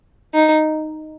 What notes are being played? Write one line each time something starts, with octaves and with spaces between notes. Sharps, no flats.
D#4